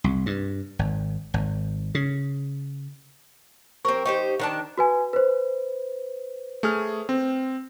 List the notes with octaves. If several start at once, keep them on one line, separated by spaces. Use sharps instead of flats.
C2
G2
G#1
G#1
C#3
C4 G4 A#4 C5 C#6
D#4 G4 C5 C#6
D#3 D4 A5
F#4 B4 G#5
B4 C5
A3 G#4 F6
C4